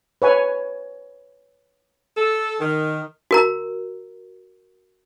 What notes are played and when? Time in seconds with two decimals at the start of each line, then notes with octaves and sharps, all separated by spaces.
0.22 B4 C#5 G#5
2.16 A4
2.60 D#3
3.31 F#4 A#4 A#5